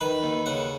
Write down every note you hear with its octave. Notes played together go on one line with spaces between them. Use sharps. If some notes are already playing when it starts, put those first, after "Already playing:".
D#3 B4
D#2
C#3 F#5